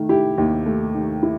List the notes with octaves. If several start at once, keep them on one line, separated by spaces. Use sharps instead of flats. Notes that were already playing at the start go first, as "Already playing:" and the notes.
Already playing: D#3 A3
E4 G4
D#2
A3
D#3
E4